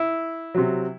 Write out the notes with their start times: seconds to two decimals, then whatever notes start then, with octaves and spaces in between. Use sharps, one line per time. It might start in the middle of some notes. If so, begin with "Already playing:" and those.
Already playing: E4
0.55 C3 F#3